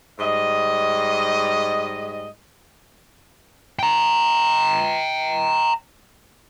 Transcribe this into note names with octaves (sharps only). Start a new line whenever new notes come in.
G#2 G3 D#5
G5 A#5